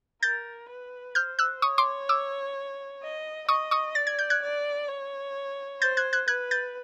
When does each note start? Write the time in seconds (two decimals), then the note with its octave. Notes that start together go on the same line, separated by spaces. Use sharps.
0.23 A#4 G6 A6
0.69 B4
1.15 C5 F6 G6
1.39 E6 F#6
1.62 C#5 C#6 D#6
1.78 C6 D6
2.09 D6 E6
3.02 D#5
3.48 D#5 C#6 D#6
3.71 C#6 D#6
3.95 D5 A6
4.07 G#6
4.19 G6
4.30 F#6 G#6
4.42 D5
4.88 C#5
5.81 C5 G6 A6
5.97 F#6 G#6
6.13 F#6 G#6
6.28 B4 F#6 G#6
6.51 G6 A6